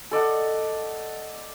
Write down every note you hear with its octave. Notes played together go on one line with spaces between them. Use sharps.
A4 D5 D#5 F#5